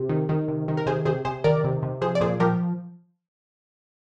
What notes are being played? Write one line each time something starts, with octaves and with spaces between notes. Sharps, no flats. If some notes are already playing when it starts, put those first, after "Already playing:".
Already playing: C3
D#3
D#3
C3
D#3
A#4
C3 G#4 C5
C3 G#4 C5
C3 G#4 C5
D#3 A#4 D5
C3
C3
F3 G#4 C5
D5
A#2 G#4 C5
F3 G4 A#4